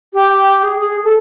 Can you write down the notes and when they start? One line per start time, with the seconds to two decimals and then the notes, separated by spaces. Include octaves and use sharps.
0.13 G4
0.63 G#4
0.79 G#4
1.04 A4